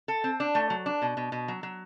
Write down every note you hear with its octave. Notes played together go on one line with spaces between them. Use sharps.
A4
C4
D4
A3
F#3
D4
B2
B2
B2
F#3
F#3